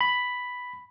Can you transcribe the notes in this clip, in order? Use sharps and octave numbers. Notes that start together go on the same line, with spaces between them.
B5